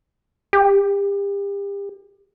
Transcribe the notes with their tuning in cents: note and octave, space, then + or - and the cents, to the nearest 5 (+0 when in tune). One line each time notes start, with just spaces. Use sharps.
G4 +35